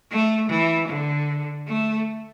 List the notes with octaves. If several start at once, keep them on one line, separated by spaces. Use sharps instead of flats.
A3
E3
D3
A3